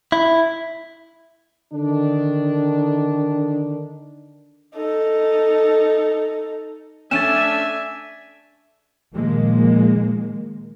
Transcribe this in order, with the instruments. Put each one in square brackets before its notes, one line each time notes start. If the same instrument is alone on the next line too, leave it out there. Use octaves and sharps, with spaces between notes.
[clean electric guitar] E4
[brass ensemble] D3 D#3 D4
[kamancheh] D#4 A4
[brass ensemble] A3 D4 [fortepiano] C#4 [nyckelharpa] E5 G#5 [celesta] A6 D#7 E7
[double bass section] A#2 D#3 F3 G#3 A#3